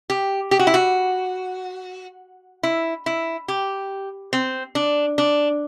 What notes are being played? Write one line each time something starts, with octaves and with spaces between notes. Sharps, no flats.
G4
G4
F#4
E4
F#4
E4
E4
G4
C4
D4
D4